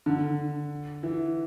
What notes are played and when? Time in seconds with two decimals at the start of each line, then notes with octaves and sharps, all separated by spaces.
0.06 D3
1.03 E3